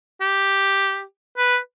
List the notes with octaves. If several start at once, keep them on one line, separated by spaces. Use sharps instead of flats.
G4
B4